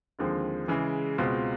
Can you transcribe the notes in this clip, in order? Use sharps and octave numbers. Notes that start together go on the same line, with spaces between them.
D#2 D3 F3 G#3 C4
C#3 E3 G#3
C#2 B2 G#3 C4 F4